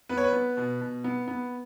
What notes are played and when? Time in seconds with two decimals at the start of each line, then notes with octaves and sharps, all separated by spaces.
0.09 B3 B4
0.17 C#5
0.24 B4
0.33 B3
0.57 B2
0.81 B2
1.04 B3
1.28 B3